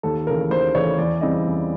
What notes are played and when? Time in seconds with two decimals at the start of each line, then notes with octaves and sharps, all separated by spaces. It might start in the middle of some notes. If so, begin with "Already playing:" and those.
0.03 D#2 A4
0.27 C#3 E3 A3 A#4
0.50 D#2 C5
0.75 C#3 E3 A3 C#5
0.98 E2 D5
1.21 C#3 E3 G3 C4 D#5
1.45 E2